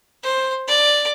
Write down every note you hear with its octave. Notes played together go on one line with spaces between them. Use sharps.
C5
D5